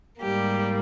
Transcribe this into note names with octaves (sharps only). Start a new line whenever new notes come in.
G#2 G3 A#3 G4